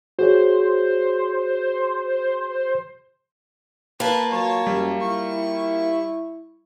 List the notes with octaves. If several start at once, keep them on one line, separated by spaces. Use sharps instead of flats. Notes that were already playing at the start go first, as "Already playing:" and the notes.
F#4 G#4 C5 C#5
A#3 F4 B4 A5
F#3 C#5 A5
F#2 G3
E4 C#6